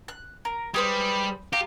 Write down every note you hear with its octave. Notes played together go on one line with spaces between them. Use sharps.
F#6
A#4
G3 G#4 B4 C5
F4 G4 A#5